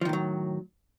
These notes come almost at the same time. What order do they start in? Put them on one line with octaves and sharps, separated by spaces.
F3 D#3 A2 F#3